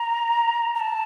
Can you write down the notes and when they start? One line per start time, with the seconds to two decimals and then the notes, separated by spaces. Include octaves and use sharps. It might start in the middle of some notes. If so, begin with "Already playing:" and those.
Already playing: A#5
0.75 A#5
0.80 A5